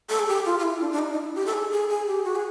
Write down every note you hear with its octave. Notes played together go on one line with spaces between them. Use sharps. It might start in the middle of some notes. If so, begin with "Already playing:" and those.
A4
G#4
G4
F4
F4
E4
D4
D4
D#4
D#4
E4
G4
A4
G#4
G#4
G#4
G4
F#4
G#4